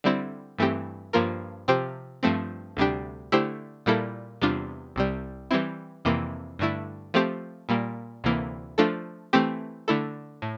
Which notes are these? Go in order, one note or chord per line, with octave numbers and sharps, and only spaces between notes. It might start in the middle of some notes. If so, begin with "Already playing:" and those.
D3 G3 C4 E4
G2 E3 A3 C4 G4
G2 F3 A#3 F4 A#4
C3 F3 C4 G4 C5
G2 F3 A3 C4
D2 C3 G3 D4 G4
D3 A3 E4 G4 C5
A#2 G3 A#3 E4 A4
E2 C3 G3 D4 F4
C2 C3 G3
E3 G3 C4 E4
F2 C3 E3 A#3
G2 D3 A3 E4
F3 A3 C4 G4 C5
A#2 G3 A#3
D2 C3 E3 A#3
F3 A3 D4 F4 A4
E3 A3 C4 G4
D3 A3 E4 A4
A2